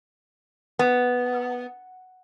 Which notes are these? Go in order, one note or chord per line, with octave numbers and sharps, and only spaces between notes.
B3